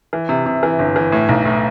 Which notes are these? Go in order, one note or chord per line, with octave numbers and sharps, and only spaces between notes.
E3
C3
C3
E3
G1
E3
A2
B1
A2